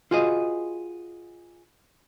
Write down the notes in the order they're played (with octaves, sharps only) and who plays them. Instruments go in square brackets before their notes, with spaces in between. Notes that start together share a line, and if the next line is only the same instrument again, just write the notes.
[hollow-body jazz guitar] F4 F#4 G#4 B4 D#5